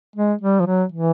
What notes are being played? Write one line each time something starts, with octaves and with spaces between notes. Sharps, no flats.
G#3
G3
F3
F#3
E3